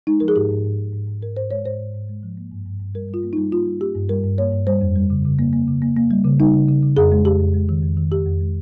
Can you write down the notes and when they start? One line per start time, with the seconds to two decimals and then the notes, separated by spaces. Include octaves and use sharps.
0.07 G#3 D#4
0.20 F3 A#4
0.28 G#4
0.36 G#2 G4
0.50 G#2
0.65 G#2
0.78 G#2
0.93 G#2
1.08 G#2
1.22 G#2 A#4
1.37 G#2 C5
1.51 G#3 C#5
1.66 G#2 C5
1.80 G#2
1.94 G#2
2.09 G#3
2.23 F3
2.37 A#3
2.52 G2
2.66 G2
2.80 G2
2.94 G3 A#4
3.09 G3 F4
3.23 A#3
3.33 G3 D#4
3.52 A#3 F4
3.66 G3
3.80 A#3 G4
3.95 G2
4.09 G3 A#4
4.24 G2
4.38 A#3 C#5
4.52 G2
4.67 G3 C5
4.81 F2
4.96 G3
5.10 C#3
5.25 C#3
5.39 A#3
5.53 A#3
5.68 C#3
5.82 A#3
5.96 A#3
6.11 G3
6.24 C#3
6.39 G3 D#4
6.54 C#3
6.68 C#3
6.83 C#3
6.97 F2 G#4
7.12 G#3
7.25 F2 G4
7.40 F2
7.54 G#3
7.69 D#3
7.83 F2
7.97 D#3
8.12 F2 G4
8.26 F2
8.40 G#3